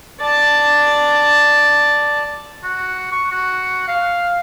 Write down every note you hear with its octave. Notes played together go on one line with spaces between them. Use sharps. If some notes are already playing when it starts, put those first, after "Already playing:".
D5 A5
F#4
C#6
F#4
F5